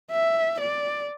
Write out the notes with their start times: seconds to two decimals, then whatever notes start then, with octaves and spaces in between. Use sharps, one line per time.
0.11 E5
0.60 D5